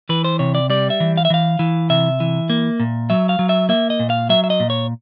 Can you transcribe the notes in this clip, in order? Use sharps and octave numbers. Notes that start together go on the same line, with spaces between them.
E3 B4
C5
C3 C#5
D5
G3 D5
E5
E3
F5
E5
E3 F5
E3
C3 E5
E3
A#3
A#2
F#3 E5
F5
F#3
E5
A#3 E5
D#5
A#2
F5
F#3 E5
E5
D#5
A#2
C#5